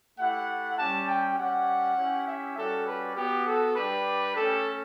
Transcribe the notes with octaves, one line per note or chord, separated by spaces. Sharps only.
A3 E4 G4 F#5
G3 C#4 G4 A5
G5
G3 C#4 G4 F#5
C#4 E4 G4
E5
G3 C#4 F#4 A4
B4
B3 F#4 G4
A4
G3 D4 G4 B4
A3 C#4 G4 A4